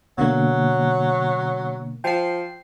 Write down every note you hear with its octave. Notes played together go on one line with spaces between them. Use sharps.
B2 D3 F#3 A#3
F3 G5 C7